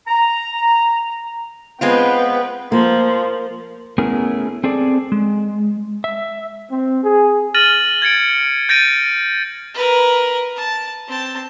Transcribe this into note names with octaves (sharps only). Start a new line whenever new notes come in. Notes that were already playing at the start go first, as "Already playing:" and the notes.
A#5
G#3 B3 C4 F4 B4 G5
F3 A#3
A3 B3 C#4 E4 G#4 A#4
C4 G#4 A4 D5
G#3
E5
C4
G#4
F6 A6 A#6 D#7 F#7
G#6 A6 C#7 D7
G6 A6 A#6 D7 D#7
A#4 B4
A5
C4 A5